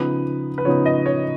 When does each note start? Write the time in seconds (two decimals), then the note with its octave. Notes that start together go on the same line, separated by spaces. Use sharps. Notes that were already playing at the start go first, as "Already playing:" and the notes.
Already playing: C#3 F3 B3 D#4 B4
0.58 B4
0.65 C#3 F3 B3 D#4 C#5
0.86 D#5
1.06 C#5